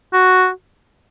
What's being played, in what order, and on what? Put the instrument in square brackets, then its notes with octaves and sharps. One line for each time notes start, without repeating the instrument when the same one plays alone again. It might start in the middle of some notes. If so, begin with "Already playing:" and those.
[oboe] F#4